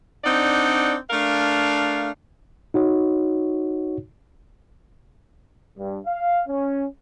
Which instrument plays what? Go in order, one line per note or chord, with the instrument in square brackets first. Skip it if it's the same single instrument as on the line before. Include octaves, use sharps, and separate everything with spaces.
[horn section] C4 D4 D#4 D5 F#5
A3 D4 A#4 F5
[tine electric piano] D#4 F#4 C#5
[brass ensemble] G2
F5
C#4